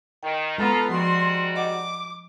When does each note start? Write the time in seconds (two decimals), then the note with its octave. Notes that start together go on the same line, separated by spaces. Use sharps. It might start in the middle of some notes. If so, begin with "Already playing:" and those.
0.23 D#3 G5
0.58 G#3 B3 F4 A4 A#5
0.89 G#2 F3 G3 F#4 C6
1.56 D#5 F#5 D6